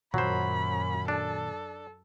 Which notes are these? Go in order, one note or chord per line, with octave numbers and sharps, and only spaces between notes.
F#2 A#2 D#3 F#3 C5 B5
D4 A4